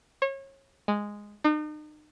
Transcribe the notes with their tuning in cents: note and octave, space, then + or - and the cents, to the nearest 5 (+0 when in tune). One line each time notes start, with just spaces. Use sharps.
C#5 -30
G#3 -5
D#4 -40